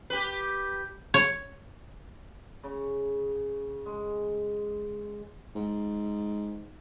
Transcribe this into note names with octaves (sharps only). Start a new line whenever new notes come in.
G4 B4
C#5
C#3
G#3
G#2